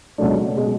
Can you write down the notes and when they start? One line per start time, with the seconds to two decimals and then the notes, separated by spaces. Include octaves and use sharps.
0.18 C#2 B2 F#3 A3 D4
0.57 B2 G#3